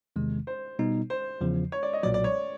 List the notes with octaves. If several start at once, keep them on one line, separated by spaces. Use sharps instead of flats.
E2 C3 D#3 G#3
C5
B2 G3 B3 D#4
C5
E2 C#3 F3
C#5
D5
D#5
B1 A#2 F#3 D5
D5
C#5